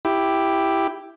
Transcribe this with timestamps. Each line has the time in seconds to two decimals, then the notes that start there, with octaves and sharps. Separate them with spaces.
0.05 E4 G4